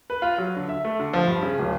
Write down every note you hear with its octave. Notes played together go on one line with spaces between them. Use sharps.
B4
F4
F#3
D3
E5
A3
D3
F3
G2
C#3
D1